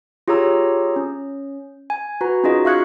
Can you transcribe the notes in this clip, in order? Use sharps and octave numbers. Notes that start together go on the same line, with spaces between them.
F4 G4 G#4 C#5 A#5 E6
C#4
G#5
F#4 B4 A#5
C#4 D#4 F4 F#4 G#4 D#5
E5 F5 C#6 F#6 G#6 C#7